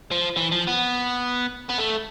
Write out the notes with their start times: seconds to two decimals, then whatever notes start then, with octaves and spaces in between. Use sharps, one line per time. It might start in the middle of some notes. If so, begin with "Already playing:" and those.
0.11 F3
0.36 E3
0.51 F3
0.67 B3
1.70 B3
1.79 A3